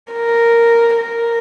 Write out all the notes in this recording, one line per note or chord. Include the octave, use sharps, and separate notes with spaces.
A#4
A#4